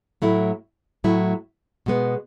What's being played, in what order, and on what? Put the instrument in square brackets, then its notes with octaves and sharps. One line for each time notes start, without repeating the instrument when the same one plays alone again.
[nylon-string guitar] A2 F#3 A3 E4
A2 F#3 A3 E4
B2 G#3 B3